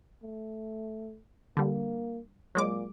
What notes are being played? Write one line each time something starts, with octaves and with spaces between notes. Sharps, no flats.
A3
D3 G3 A#3
A#2 F#3 G#3 D6